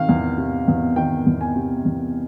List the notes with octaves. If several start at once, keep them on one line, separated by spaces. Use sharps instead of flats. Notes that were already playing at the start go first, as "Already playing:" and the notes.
Already playing: C3 D#3 F5
E2
C3
E2
D#3 G5
E2
G#5
C3
E2